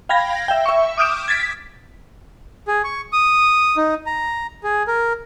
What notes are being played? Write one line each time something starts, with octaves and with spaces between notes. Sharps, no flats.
F5 G5 B5 G#6 A#6
E5 G5
E5 C#6
D6 D#6 F6 G6 D7 E7
G#6 A6 B6 D7
B6
G#4
C#6
D#6
D#4
A#5
G#4
A#4